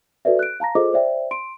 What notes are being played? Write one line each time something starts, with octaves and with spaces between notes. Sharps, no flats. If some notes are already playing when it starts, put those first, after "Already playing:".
F#4 A4 B4 D5 E5
F#6 D7
F5 A5 A#5 A#6
F4 G#4 A4 C5 D#5 D6
C5 D5 E5 G5
C6 D7